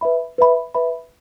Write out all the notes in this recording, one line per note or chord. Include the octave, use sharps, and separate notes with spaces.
B4 E5 B5
B4 E5 B5
B4 E5 B5